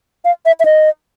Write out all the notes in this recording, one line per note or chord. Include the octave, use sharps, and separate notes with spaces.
F5
E5
E5
D#5